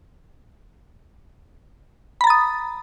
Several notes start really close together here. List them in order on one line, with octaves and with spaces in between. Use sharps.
B5 A#5 A6 D#6